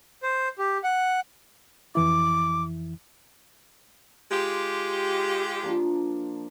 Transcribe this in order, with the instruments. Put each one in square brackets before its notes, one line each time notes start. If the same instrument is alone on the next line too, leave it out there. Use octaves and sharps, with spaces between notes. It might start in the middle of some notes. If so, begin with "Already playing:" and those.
[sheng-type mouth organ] C5
G4
F#5
[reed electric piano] F2 E3 E4 [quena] D6
[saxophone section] G#3 F4 G4
[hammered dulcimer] F3 A#3 D4